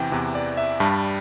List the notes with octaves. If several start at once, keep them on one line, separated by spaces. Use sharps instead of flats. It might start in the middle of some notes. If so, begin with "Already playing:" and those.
Already playing: E2 C3 E3 G5
E2 C3 E3
D5
E5
G2 G3 A5